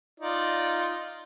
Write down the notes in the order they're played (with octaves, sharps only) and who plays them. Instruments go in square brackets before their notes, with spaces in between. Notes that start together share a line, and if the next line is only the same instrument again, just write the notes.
[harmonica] D#4 F4 D5